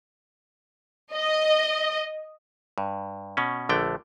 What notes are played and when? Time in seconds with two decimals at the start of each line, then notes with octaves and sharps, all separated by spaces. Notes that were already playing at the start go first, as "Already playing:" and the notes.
1.14 D#5
2.78 G2
3.37 B2 C#4
3.69 A#1 D3 A3 G5